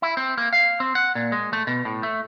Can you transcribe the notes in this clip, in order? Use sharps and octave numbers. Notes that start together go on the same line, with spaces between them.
E4
C4
A#3
F5
C4
F#5
A#2
G#3
A3
B2
A2
A3